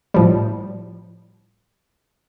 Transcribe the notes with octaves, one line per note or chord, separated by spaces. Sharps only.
A2 F3 G3